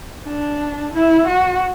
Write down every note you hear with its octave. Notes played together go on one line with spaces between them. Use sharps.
D4
E4
F#4